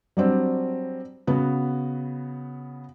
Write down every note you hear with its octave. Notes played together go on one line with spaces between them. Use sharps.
F#3 G3 C4 D4
C#3 B3 F#4